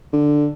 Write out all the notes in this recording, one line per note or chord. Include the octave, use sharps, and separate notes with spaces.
D3